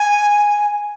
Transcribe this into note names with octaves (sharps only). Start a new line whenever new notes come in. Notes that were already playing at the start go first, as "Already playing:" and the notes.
Already playing: G#5